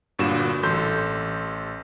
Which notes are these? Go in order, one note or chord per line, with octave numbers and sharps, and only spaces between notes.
G1 G2 A#2 F#4 E7
A1 A4 C6 G6